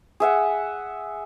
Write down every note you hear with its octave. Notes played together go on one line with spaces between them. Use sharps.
G#4 E5 F#5